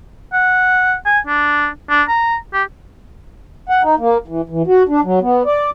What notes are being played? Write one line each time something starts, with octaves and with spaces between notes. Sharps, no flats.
F#5
G#5
D4
D4
A#5
G4
F#5
D#4
A#3
E3
E3
F#4
D4
F#3
B3
D5